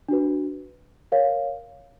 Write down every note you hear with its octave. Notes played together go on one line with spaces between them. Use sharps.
D4 F#4 B4
A#4 C#5 F5